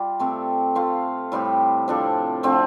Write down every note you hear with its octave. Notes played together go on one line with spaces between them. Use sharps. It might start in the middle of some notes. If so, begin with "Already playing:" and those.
Already playing: G3 F4 D5
C3 A3 C4 A4
A3 F4 C5 F5
A2 G3 C4 G4
C3 F3 D4 A4
D3 F3 A3 C4